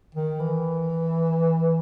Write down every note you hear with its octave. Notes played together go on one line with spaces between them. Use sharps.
D#3
E3